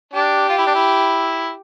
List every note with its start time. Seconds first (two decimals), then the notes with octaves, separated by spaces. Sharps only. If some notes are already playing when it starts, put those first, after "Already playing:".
0.13 D4 G4
0.49 F4
0.58 E4
0.67 D4
0.75 E4